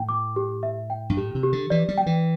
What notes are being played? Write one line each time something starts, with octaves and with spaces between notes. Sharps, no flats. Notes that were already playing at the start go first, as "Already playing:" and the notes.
Already playing: A2 G5
D6
G4
E5
G5
G2
A2 G4
C3
G4
D3
E3 D5
G3
G5
E3